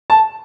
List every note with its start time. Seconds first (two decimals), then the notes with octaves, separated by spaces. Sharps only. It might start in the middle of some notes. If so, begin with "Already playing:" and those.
0.10 A5